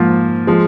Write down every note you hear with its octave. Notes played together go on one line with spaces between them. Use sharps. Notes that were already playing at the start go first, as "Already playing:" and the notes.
Already playing: G#2 F3 A#3 F4
F3 G#3